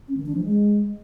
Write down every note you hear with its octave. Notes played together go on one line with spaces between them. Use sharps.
C#4
D#3
D4
F3
G#3